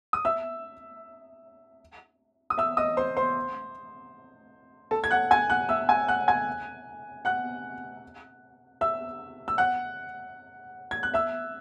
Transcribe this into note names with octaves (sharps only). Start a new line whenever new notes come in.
D#6
E5 E6
D#6
E5 E6
D#5 D#6
C5 C6
C5 C6
A4 A5
G#6
F#5 F#6
G#5 G#6
F#5 F#6
E5 E6
G#5 G#6
F#5 F#6
G#5 G#6
F#5 F#6
E5 E6
E6
F#5 F#6
G#6
F#6
E5 E6